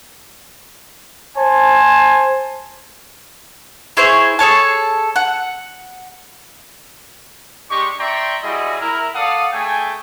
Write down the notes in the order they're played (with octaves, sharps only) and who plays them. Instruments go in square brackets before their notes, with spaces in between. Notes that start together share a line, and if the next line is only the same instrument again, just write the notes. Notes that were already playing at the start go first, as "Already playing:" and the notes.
[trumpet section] C5 G#5 A5
[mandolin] E4 G#4 C5 C#5
G#4 A4 C#5 A5
F#5
[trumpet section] G#3 D4 G4 D#5 C#6
D5 E5 G5 A#5 C6 C#6
G3 G#3 E4 F#4 G#4 D#5
E4 A#4
A4 D5 F5 F#5 D#6
A3 G#4 G5 G#5